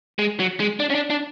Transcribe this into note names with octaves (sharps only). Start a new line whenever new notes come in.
G#3
F#3
G#3
D4
C#4
D4
D4